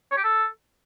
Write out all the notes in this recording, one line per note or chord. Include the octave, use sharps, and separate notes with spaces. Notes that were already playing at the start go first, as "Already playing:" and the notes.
C#5
G4
A4